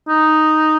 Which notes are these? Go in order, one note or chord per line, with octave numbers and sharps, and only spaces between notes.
D#4